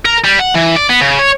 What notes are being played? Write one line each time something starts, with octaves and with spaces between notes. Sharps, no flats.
A#4
G3
F#5
E3
D5
B3
C#3
C#5